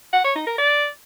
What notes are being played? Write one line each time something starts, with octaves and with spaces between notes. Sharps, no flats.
F#5
C#5
D#4
A#4
D5